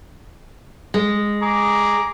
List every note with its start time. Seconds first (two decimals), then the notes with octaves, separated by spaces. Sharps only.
0.94 G#3
1.42 G#4 A#5 D6